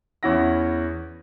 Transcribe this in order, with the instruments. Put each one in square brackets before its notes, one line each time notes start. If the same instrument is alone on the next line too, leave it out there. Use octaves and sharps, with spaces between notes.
[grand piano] E2 C#4 E4 F#5 A#6